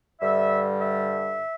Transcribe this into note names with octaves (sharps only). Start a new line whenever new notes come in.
G2 D3 G3 E5
E5